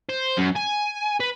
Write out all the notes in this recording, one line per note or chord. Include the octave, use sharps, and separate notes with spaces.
C5
F#2
G#5
B4